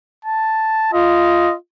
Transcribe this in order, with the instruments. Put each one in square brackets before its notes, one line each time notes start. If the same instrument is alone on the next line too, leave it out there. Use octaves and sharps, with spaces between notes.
[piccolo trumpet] A5
[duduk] F4 [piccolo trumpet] D#5